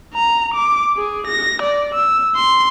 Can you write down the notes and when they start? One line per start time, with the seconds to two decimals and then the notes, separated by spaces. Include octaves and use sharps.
0.14 A#5
0.54 D6
0.98 G#4
1.27 A#6
1.62 D5
1.94 E6
2.36 C6